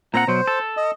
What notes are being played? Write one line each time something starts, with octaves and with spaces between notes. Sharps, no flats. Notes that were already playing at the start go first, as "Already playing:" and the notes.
A#2 C4 F#5 A#5
B2 F#3 C5
A4
D#5